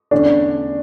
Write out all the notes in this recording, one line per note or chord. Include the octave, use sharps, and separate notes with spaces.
E2 D3 A3 C#4 D4